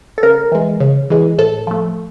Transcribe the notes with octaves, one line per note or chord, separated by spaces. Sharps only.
A4
C#3 A#4
E3 G#3
C#3
E3 G#3
A2 A4
F3 A3